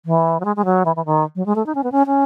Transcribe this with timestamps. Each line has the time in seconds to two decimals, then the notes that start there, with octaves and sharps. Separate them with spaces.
0.06 E3
0.40 F#3
0.45 G#3
0.56 G#3
0.65 F#3
0.85 E3
0.96 E3
1.05 D#3
1.36 F#3
1.46 G#3
1.56 A3
1.66 D#4
1.75 C#4
1.84 B3
1.92 C#4
2.07 C#4